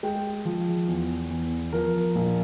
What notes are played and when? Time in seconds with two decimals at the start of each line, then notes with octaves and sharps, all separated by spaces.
0.03 G#3 G5
0.45 F3
0.88 E2
1.30 E2
1.73 F3 A#4
2.15 A#1